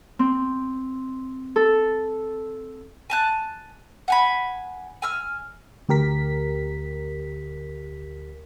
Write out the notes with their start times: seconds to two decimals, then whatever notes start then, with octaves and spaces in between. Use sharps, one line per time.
0.19 C4
1.56 A4
3.10 G#5 A5 F#6
4.08 F#5 G#5 B5
5.02 G#5 E6 F6
5.89 D2 G4 A#4 B6